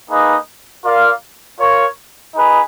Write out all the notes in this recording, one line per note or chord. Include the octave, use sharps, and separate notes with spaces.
A#3 D#4 G#4 B4 D#5
F4 A#4 D5 F5
F4 A#4 C#5
D#4 G#4 B4